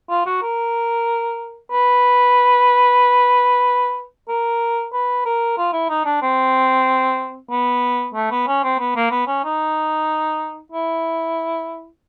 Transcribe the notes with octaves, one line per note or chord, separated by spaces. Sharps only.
F4
F#4
A#4
B4
A#4
B4
A#4
F4
E4
D#4
D4
C4
B3
A3
B3
C#4
C4
B3
A#3
B3
C#4
D#4
E4